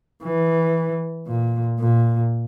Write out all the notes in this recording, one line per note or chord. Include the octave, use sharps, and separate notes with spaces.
E3
A#2
A#2